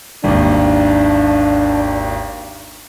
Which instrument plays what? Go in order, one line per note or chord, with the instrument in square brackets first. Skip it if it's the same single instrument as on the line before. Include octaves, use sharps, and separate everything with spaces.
[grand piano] G#1 D#2 [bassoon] D4